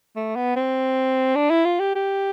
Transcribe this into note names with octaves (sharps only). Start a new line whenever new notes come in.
A3
B3
C4
D4
E4
F4
G4
G4